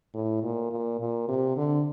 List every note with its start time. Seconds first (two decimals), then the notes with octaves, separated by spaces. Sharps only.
0.14 A2
0.42 A#2
0.71 A#2
1.00 A#2
1.28 C3
1.57 D3